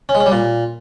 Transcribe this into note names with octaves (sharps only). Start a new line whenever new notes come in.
C#4
G#3
C#4
G3
A#2